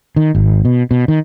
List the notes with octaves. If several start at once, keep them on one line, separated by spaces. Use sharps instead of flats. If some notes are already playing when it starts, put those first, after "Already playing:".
D#3
G#1
B2
B2
D#3